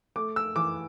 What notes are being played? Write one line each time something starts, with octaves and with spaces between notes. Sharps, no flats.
A3 D6
E6
E3 D6